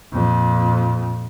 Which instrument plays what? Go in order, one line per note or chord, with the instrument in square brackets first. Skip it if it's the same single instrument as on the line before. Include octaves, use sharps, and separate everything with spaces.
[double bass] F2 A#2